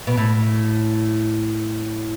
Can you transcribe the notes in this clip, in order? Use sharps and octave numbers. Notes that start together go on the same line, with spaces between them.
B2
A2